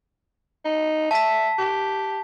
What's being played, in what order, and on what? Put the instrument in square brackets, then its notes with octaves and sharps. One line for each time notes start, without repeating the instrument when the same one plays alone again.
[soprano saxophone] D#4
[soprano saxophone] E5 [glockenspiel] A5 B6
[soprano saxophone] G4